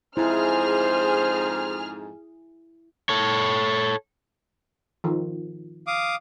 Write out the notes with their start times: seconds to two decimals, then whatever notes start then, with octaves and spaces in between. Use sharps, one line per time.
0.17 F2 G#2 E4 G#4 C5 F6
3.09 A4 C#5
5.04 D#3 F3
5.87 F5 D6 D#6